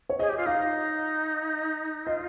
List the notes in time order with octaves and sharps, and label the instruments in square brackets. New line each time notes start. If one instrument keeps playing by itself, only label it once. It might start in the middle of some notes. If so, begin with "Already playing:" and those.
[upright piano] C#5
[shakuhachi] G#4 [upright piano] D#5
[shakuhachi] G4
F4
[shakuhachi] D#4 [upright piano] F5
[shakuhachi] F4 [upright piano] D#5